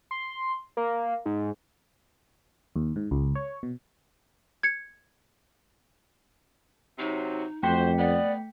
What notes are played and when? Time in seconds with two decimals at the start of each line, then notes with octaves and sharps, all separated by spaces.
0.11 C6
0.77 A#3
1.26 G#2
2.76 D#2
2.96 G#2
3.11 C#2
3.36 C#5
3.63 B2
4.63 G#6 C#7
6.99 C3 F#3 D#4
7.63 F2 A3 F#4 C5 G5 B6
7.98 B3 D5